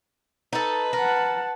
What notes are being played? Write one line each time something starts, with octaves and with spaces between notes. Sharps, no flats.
D#4 A4 B4
A#4 F#5 A5